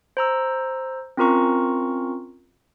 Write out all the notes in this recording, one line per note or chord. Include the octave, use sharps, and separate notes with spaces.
C5 A#5 E6
C4 C#4 F4 A#4 A#5 C#6